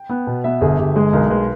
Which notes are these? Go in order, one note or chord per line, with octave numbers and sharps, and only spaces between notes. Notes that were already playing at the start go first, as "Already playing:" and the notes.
Already playing: G5
B3
B2
B3 E5
G1 G#4
G1 G4
G#3 G#4
B1 A#4
G#3 B4